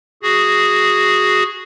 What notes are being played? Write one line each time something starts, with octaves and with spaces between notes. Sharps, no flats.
F#4 G#4